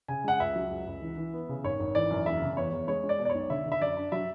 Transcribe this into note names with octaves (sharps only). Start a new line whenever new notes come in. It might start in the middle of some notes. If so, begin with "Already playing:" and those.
C#3 G#5
G#3 F#5
C#2 E5
F#3
C#2
C#2
E3
E3
B3
C#3
G#1 C#5
G#1
E3 D5
F#2
E1 E5
C#3
E2 C#5
E2
G#3 C#5
G#3
D5
B2
D5
C#5
B1
D3 E5
D3
E5
F#2 D5
D4
F#3 E5